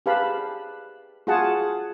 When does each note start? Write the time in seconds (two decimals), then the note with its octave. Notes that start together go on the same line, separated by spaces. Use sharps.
0.06 G4 G#4 B4 F5 A5 B5
1.27 F4 F#4 G#4 F#5 A5